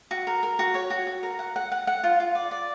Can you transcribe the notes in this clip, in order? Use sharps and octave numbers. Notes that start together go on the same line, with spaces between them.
F#4
A#4
A#4
F#4
C#5
F#4
F#4
A#4
F#5
F#5
F#5
F#5
F4
F4
D5
D5